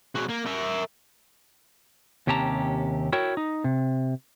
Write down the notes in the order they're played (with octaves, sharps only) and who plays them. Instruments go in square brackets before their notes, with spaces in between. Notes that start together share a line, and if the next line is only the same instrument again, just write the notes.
[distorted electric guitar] G#3 F#4
A#3
A#4 E5
[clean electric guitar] D#2 C3 C#4 G4 A5 A#5
E4 F#4 A#4 C#5 G5
D#4
C3